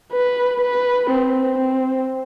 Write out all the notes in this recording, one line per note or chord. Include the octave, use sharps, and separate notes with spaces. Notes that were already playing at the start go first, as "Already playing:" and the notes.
B4
B4
C4
C4